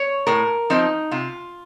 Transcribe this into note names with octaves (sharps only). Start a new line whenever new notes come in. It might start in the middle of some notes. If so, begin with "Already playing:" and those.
Already playing: C#5
A2 A#4
F3 C4 D#4
C3 F4